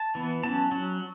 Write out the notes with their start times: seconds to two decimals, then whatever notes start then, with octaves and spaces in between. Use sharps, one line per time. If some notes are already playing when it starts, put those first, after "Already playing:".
Already playing: A5
0.15 E3 B3
0.43 F#3 C#4 A5
0.72 F#3 C#4